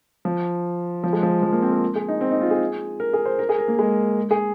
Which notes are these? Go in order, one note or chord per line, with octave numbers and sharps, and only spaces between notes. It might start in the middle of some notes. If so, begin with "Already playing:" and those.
F3
F3
G#3
F3
F3
A#3
C4
A#4
G#4
D#4
C4
D#4
F4
G#4
A#4
G#4
C5
A#4
G#4
A#4
A#3
G#3
G#4